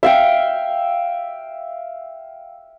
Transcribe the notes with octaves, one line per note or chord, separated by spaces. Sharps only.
E5 F5 G5